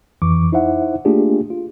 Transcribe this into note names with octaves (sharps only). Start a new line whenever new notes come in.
F2 E3 C#6 D6
D#4 E4 C5 E5 F#5
A3 A#3 D4 F4 G4 G#4
F4